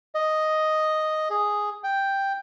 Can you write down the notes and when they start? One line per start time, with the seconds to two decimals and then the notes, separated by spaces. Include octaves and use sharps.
0.15 D#5
1.30 G#4
1.84 G5